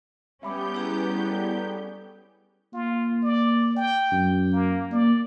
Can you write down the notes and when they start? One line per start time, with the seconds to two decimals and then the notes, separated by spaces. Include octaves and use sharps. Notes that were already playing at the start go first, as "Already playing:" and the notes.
0.43 G3 B3 C#4 G4 E5 B5 D6 G6
0.75 E4 G#4 A#5
1.30 A4 D5
2.73 A#3 F4
3.24 D5
3.77 G5
4.12 F#2
4.53 A#3
4.92 A#3 D5